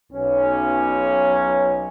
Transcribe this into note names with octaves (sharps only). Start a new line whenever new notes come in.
B1 C#4